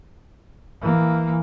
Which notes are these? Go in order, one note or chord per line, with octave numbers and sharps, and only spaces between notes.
E3 A#3